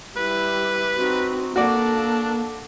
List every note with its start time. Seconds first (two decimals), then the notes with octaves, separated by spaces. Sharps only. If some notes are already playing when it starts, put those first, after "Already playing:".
0.17 G3 E4 B4
0.97 C4 D#4 F#4
1.56 A#3 D4 F#4 A4 D5